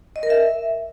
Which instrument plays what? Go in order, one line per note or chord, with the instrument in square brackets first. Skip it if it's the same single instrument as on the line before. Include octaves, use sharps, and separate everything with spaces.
[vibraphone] D#5
A#4
E5